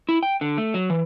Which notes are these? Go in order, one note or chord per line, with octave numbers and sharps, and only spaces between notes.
E4
G5
D3
A3
F#3
E3